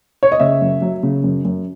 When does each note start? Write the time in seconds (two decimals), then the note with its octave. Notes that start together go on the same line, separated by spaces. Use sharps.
0.23 C#5
0.32 D#5
0.40 C#3 E5
0.61 F#2
0.82 F#3
1.03 C#3
1.23 F#2
1.45 F#2